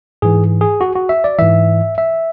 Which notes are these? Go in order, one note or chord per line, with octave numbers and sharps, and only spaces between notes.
G#2 E3 G#4
G#4
F#4
F#4
E5
D5
G#2 E3 E5
E5